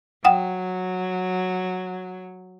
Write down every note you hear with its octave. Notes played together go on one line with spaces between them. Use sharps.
F#3 F#5 G5 D#6